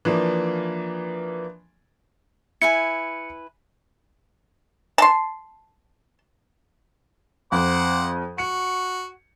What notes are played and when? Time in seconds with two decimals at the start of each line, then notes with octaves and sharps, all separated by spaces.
0.05 E3 F3 A#3 D4
2.62 E4 B4 G#5 C#7
4.98 A5 C6
7.52 F2 C5 F#5 D6
8.38 F#4 C#7